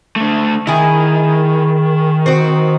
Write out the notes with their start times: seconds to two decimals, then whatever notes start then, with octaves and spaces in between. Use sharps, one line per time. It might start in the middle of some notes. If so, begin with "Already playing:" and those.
0.16 A3 D4
0.67 D#3 E4 G#4
2.26 C4 F#4